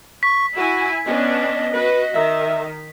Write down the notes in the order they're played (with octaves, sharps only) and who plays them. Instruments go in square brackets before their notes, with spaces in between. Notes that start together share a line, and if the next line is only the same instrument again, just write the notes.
[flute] C#6 [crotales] B6
[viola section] E4 G#5 [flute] F#4
[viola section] B3 C#4 D4 [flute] D#5
[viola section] F#4 [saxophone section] B4
[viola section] D#3 [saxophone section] E5